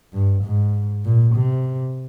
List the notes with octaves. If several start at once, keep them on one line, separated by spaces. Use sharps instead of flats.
G2
G#2
A#2
C3